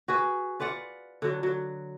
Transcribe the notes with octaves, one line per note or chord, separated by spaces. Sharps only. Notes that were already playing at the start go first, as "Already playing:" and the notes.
F#4 G#4 B4
F4 B4 D5 F#5
D3 F#3
F#3